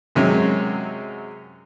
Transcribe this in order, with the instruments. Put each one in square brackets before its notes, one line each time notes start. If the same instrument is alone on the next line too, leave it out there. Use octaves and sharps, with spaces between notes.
[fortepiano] F#2 C3 F#3 G#3 C#4